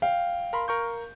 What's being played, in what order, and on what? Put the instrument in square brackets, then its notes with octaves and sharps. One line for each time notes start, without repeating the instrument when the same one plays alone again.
[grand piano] F5 [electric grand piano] G5
[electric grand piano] A#4 B5 C6
A#4 C#6 G6